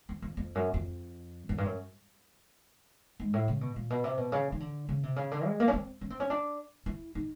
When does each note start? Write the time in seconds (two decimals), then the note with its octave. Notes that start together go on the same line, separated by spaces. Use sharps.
0.09 F2
0.22 F2
0.37 F2
0.55 F#2
0.74 F2
1.49 F#2
1.58 G2
1.65 F#2
3.20 G#2
3.33 A2
3.48 C#3
3.61 B2
3.76 A#2
3.90 B2
4.04 C3
4.17 B2
4.32 C#3
4.52 D#3
4.60 D3
4.89 C#3
5.03 C3
5.16 C#3
5.31 D3
5.46 G#3
5.60 A#3
5.68 C#4
5.73 C4
6.01 C#4
6.10 C4
6.20 C#4
6.30 D4
6.86 E4
7.15 D#4